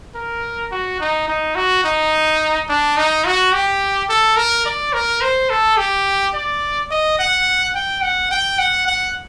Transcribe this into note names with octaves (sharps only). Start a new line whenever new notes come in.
A#4
F#4
D#4
D#4
F#4
D#4
D4
D#4
F#4
G4
A4
A#4
D5
A#4
C5
A4
G4
D5
D#5
F#5
G5
F#5
G5
F#5
F#5